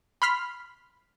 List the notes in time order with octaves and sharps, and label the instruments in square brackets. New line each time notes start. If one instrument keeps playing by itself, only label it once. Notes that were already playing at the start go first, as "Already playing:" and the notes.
[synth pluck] B5 C6 F6 B6